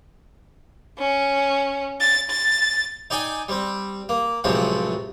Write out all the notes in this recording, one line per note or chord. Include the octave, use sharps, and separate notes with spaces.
C#4
A6
A6
D#4 D5 G5 G#5
G3 C4
A#3
C#2 A2 C3 F3 F#3 C4